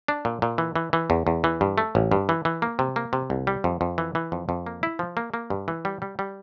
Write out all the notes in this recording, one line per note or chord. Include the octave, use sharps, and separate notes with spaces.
D4
A#2
A#2
E3
E3
E3
E2
E2
E3
G2
A3
A1
G2
E3
E3
A#3
C3
A#3
C3
C2
G3
F2
F2
E3
E3
F2
F2
A#3
E4
F3
A#3
A#3
G2
E3
G3
G3
G3